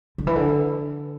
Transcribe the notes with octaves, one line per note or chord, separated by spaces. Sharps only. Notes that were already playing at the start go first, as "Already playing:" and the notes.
D3
E3
D3